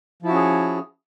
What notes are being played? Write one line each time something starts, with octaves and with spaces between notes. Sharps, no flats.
F3 C#4 E4 F#4 G#4